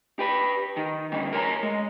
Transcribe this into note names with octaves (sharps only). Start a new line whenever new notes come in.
G4 B4
D#3
D3 G3 C#4
A#4 C#5 G#5 A#5
G#3